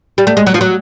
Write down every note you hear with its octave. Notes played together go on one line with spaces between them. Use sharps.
G3
A3
G#3
F#3
F3
F#3